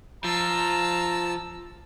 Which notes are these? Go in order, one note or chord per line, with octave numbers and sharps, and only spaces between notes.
F3 A5 A#5 E6